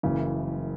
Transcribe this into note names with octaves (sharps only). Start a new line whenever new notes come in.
F#1 F#2 C#3 E3